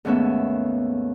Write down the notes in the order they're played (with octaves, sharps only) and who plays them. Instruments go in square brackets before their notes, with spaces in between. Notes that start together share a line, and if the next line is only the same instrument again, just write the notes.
[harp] D#2 G#2 A3 B3 C#4 E5